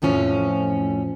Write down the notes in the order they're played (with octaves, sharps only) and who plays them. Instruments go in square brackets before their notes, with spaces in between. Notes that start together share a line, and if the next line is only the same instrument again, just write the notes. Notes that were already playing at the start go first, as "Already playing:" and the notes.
[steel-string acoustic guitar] F2 A2 F3 C#4